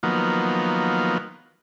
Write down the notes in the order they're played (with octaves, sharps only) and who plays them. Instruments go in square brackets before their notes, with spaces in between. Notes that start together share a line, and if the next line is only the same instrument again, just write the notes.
[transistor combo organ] D#3 F3 F#3 A#3 B3